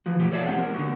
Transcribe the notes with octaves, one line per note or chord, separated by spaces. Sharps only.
E3 F3 F#4
B2 F3 F#3 A3 G4
A4 C#5 D5 E5 F5 A5
G#3 C4 G4 F#5
A#4
D3 B3 F#4